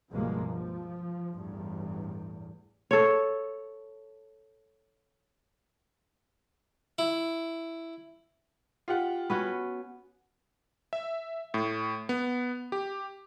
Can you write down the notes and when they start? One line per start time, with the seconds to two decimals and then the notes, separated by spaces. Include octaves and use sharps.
0.12 C#2 G2 B2 F3 G#3 A#3
0.48 F3
1.32 A1 E2 G2
2.91 A4 C#5
6.98 E4
8.88 F4 G4 F#5
9.30 B3 C#4 F#4
10.93 E5
11.54 A2
12.09 B3
12.72 G4